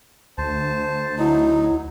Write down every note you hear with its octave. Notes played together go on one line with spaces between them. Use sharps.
D2 C5 A5
F#3 D#4 E4